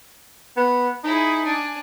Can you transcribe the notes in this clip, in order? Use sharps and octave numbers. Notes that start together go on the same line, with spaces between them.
B3
D#4 E4 G#4
D4 G#5